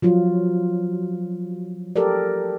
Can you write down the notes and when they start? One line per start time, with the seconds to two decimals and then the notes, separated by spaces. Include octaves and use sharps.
0.02 F3 F#3 F4
1.96 G4 A4 A#4 D5